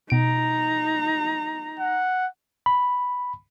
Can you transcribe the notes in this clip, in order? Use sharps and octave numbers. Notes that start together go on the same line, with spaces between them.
B2 D#4 A#5 D7
F#5
B5